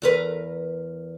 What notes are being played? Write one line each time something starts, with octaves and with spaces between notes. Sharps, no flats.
E2 A#4 B4